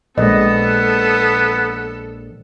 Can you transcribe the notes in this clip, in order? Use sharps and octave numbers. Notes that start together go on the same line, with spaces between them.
A#1 G#3 B3 A4 D#5